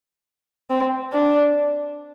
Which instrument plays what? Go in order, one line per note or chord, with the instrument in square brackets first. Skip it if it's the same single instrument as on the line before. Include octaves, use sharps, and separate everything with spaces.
[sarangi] C4
D4